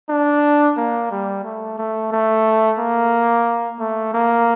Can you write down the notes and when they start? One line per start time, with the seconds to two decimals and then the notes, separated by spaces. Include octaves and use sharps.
0.09 D4
0.77 A#3
1.11 G3
1.44 A3
1.78 A3
2.12 A3
2.79 A#3
3.80 A3
4.13 A#3